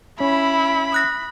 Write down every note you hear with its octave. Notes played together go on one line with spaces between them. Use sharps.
C#4 E4 B5
D#6 F#6 A#6